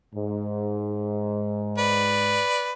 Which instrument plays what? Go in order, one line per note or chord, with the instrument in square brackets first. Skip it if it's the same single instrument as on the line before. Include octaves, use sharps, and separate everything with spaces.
[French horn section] G#2
[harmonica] B4 D5